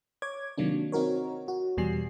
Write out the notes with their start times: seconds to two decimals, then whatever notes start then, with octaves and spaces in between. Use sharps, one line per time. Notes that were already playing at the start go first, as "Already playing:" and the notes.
0.22 C#5 D6 G#6
0.58 C3 D#3 F#3 A#3 D4
0.92 C4 D#4 F#4 A#4 C#5
1.48 F#4
1.77 E2 B2 G3 G#5 C7